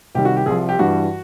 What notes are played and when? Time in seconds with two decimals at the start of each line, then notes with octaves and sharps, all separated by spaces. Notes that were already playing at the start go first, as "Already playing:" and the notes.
0.15 C2 C3 D#3 G3 G4
0.25 F#4
0.37 G4
0.46 C2 C3 F3 G#4
0.69 G4
0.79 G2 E3 G3 F#4